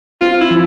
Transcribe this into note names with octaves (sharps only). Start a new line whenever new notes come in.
C4 F4
E4
F3